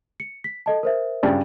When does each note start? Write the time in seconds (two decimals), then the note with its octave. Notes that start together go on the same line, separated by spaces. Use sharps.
0.20 C#7
0.44 B6
0.66 A4 D#5 A5
0.83 A#4 C5 E5
1.23 G2 C#3 D5